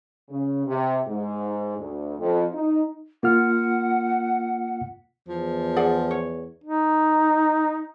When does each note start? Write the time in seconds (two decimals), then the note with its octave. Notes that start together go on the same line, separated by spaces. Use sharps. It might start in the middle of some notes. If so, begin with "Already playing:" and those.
0.30 C#3
0.67 C3
1.07 G#2
1.78 D2
2.19 F2
2.53 D#4
3.23 A#3 F4 F#5 F6
5.29 E2 F3
5.76 G#4 D5 F#5
6.11 C#5
6.64 D#4